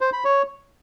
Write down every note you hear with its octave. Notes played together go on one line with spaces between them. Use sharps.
C5
B5
C#5